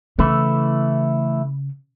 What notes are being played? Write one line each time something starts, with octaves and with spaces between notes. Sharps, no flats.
C#3 E3 A3 E4